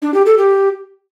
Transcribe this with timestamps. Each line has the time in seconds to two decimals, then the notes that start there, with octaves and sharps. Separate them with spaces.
0.02 D4
0.14 G4
0.26 A4
0.38 G4